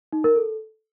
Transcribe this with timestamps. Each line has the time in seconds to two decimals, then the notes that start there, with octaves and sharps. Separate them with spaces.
0.13 D#4
0.24 A#4
0.36 A4